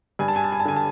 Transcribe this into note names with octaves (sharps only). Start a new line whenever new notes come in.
G2 G#5
A5
G#5
A5
G#5
A5
D3 G#5
A5